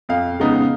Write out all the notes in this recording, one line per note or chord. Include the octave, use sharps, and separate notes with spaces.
F2 F5
C#3 G#3 B3 D#4